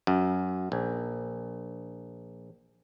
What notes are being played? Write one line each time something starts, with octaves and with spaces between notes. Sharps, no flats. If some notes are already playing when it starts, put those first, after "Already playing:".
F#2
A#1